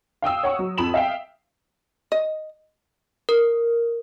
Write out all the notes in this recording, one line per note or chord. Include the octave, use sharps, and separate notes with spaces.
F5 G5 D#6 E6
C#5 F#5 C#6
F#3
F2 B5 D#6 E7 F#7
E5 F5 G5
D#5
A#4